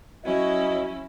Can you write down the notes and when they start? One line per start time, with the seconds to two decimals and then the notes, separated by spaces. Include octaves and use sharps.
0.25 F#3 C#4 E4 F#4 D#5